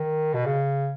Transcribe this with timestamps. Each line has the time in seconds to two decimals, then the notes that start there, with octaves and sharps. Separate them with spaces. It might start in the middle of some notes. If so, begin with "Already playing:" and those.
Already playing: D#3
0.34 B2
0.46 C#3